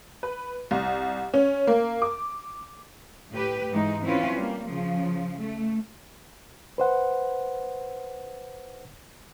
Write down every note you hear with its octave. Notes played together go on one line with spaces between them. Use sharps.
B4
C2
C#4
A#3
D6
A2 G4 B4
G#2 E3 G#3 D#4
E3 C4 C#4 E4 F4 B4
G3 A#3
C#3 F3
A3
B4 C5 F#5